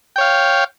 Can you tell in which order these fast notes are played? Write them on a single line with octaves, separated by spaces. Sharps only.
G5 C#5 F5